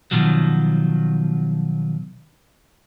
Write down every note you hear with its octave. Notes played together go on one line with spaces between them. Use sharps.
B2 D#3 F3 F#3